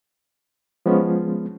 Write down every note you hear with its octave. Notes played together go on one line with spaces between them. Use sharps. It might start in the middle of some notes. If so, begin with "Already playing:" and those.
F3 G#3 B3 C#4